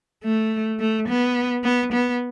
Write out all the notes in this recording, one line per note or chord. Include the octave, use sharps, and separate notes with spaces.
A3
A3
B3
B3
B3